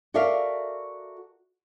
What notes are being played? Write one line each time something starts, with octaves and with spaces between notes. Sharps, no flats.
F#4 A4 A#4 D5 E5 F5